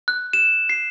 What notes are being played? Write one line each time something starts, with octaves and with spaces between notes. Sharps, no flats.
F#6
E7
C7